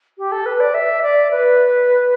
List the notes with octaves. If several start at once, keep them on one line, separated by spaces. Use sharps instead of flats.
G4
A4
B4
D5
E5
D5
B4